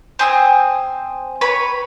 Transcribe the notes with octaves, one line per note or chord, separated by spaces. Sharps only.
C4 G#4 E6
B4 C#5 B5